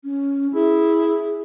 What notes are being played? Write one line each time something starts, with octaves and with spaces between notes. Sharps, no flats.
C#4
E4 G#4